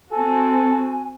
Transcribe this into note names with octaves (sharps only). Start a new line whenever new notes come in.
C4 F#4 A4 G#5